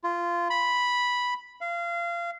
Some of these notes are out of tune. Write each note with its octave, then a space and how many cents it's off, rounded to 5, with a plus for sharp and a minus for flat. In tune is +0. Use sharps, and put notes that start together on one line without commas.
F4 -15
B5 -5
F5 -25